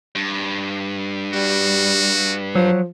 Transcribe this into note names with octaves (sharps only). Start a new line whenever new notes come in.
G2
G3 F#4
F3 F#3